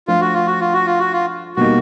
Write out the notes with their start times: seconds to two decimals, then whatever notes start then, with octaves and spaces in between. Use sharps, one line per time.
0.08 F3 A3 D4 F4
0.21 F#4
0.34 F4
0.47 F#4
0.60 F4
0.73 F#4
0.86 F4
0.99 F#4
1.13 F4
1.56 B2 G3 A#3 D#4 F#4